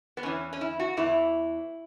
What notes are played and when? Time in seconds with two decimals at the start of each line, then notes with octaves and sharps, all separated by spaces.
0.17 B3
0.23 E2 E3 C#4
0.53 C#4
0.61 E4
0.80 F#4
0.97 E2 E3 E4